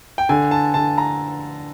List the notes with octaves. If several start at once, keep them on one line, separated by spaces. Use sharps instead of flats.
G5
D3 G#5
A5
D3 A5
A#5